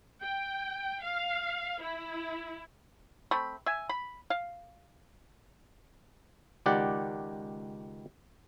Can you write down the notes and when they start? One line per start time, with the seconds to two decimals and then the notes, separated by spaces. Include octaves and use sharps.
0.23 G5
1.02 F5
1.81 E4
3.31 A3 C4 B5
3.66 E5 G#5
3.89 B5
4.30 F5
6.66 C#2 D#3 G4 D5 F#5